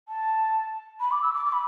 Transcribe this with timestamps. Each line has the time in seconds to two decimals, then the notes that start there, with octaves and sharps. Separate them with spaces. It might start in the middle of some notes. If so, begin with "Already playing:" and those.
0.09 A5
1.00 B5
1.12 D6
1.23 E6
1.34 D6
1.46 D6
1.53 B5